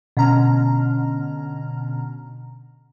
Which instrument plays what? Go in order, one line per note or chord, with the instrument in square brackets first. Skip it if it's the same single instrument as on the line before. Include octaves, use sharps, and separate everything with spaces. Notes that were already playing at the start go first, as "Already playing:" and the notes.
[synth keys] B2 D3 C#4 A#5 F6